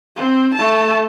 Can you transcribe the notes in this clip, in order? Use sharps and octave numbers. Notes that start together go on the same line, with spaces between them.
C4
A3 A5